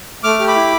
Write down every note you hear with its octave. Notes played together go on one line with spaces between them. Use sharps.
A3 D6 F6
G4
B5 D6
E4